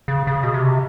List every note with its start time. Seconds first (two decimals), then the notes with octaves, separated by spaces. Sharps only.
0.08 C#3
0.27 C#3
0.43 B2
0.54 C3